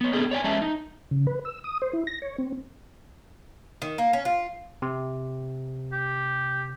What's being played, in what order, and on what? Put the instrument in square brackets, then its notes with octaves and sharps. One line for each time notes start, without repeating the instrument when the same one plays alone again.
[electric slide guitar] B3 C#5
B3 C4 D4 G#4 A4
C#5 D5 G5 G#5
F#3 G#3 C#4 E5 F5 A5
D#4
[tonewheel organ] C#3
B4
E6
D#6
C5
E4
A#6
C#5
C4
[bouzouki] D#3
A#3
C#4
F4
[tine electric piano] C3
[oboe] G4